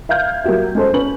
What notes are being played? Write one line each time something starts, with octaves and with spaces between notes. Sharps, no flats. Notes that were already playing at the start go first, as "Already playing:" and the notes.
E5 F5 F6 G6 G#6
F#3 A#3 F#4 G4 E5
G#3 C#4 A4 C5
C#4 B4 F#7